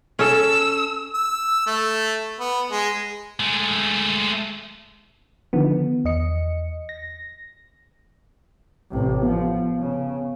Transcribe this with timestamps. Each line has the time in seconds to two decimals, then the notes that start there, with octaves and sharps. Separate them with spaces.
0.19 C#4 A4 E6
1.14 E6
1.67 A3
2.40 B3
2.72 G#3
3.40 G#3 A3
5.53 D3 D#3 F3 B3
6.05 E2 D#5 C#7
6.89 A#6
8.91 A1 C3
9.23 F3 B3
9.79 C#3